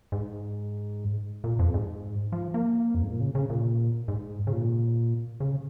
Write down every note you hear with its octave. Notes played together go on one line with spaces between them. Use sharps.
G#2
A#2
F2
G#2
F3
A#3
F2
G#2
A#2
C#3
C#3
A#2
G#2
C#3
A#2
C#3